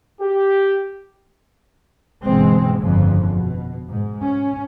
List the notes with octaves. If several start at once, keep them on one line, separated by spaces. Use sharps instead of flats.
G4
G1 B2 E3 G#3 C4
G1 F2 A#2 C#3 F3
B2
G#2
C#4